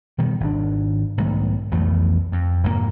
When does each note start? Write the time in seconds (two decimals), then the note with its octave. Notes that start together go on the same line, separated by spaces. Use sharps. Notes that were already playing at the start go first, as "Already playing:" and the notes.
0.18 B2 D#3 G3
0.40 G#1 D4
1.18 B1 G#2 D#3 A3
1.72 B1 F2 E3 A3
2.32 F2
2.63 F1 G#2 C3 A#3